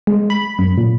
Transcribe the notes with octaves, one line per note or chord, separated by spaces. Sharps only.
G#3
B5
F#2
A#2